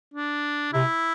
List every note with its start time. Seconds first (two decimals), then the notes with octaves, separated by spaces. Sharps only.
0.14 D4
0.73 C3 E4